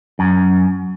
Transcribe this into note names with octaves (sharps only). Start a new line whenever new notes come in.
F#2